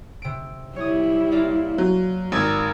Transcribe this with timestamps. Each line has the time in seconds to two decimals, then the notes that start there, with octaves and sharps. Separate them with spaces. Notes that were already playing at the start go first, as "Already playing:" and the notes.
0.22 C3 D7
0.76 G3 E4 C#5 D#6
1.32 A#3 F4 D5
1.78 F#3
2.32 G#1 A#4 G#6